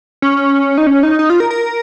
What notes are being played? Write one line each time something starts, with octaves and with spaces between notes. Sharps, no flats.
C#4
D#4
C#4
D#4
D#4
F4
A#4
A#4